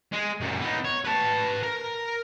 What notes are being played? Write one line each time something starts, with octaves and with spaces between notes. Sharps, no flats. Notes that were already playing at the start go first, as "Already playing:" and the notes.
G#3
F#2 A#2
B3 D#4
C#5
B4 A5
A#4